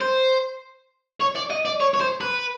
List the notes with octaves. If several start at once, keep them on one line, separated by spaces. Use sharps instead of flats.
C5
C#5
D5
D#5
D5
C#5
C#5
C5
B4